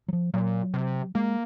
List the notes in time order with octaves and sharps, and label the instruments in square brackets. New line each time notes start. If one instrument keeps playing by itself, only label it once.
[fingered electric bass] F#3
F3
[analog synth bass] A#2 [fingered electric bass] F#3
[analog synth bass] C3
[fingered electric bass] G#3 [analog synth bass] A#3